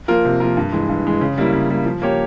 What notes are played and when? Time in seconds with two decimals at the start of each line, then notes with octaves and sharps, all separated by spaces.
0.08 F3 A#3 F4 A#4
0.25 C3
0.40 F3 A#3 F4 A#4
0.57 G2
0.72 E3 G#3
0.89 G2
1.05 E3 G#3
1.21 C#3
1.38 G3 A#3 E4
1.53 C#3
1.70 G3 A#3 E4
1.86 F3
2.02 A#3 C#4 G4 C#5